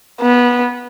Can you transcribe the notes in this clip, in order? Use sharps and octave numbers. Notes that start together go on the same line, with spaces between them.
B3